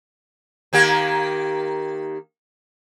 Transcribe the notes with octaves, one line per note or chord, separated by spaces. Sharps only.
D#3 A#3 G4